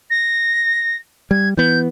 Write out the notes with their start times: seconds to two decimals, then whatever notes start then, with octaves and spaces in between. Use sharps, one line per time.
0.10 A#6
1.31 G3 G#6
1.57 E3 B3 G6